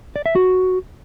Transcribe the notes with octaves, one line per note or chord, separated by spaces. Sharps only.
D5
E5
F#4